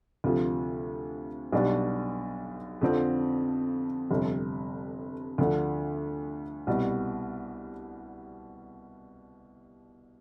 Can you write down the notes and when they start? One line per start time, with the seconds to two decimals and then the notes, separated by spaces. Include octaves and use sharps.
0.24 D2 C3 F3
1.52 B1 B2 G3 D4
2.81 F2 D3 F3 C4
4.11 G1 F2 C3
5.38 D2 D3 F3
6.67 C2 B2 G3